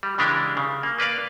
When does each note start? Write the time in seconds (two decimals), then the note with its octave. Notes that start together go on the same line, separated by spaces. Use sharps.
0.03 G3
0.18 C#3 E3 G#3 D4 G4 A#4
0.57 C#3
0.83 A#3
0.98 A#3 B4 D5 F5